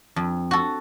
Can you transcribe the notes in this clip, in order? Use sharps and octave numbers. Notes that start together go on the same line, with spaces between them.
F2
F#4 A4